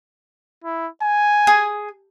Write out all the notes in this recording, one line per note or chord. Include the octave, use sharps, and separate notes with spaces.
E4
G#5
G#4